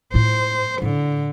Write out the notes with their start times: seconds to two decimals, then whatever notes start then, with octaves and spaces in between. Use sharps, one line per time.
0.14 A2 F4 C5
0.82 A2 D3